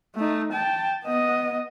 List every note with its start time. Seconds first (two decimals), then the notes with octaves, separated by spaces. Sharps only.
0.15 A3 D#4
0.52 G5 A5
1.05 B3 D#5